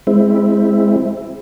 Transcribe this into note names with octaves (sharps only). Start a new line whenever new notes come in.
G#3 C4 E4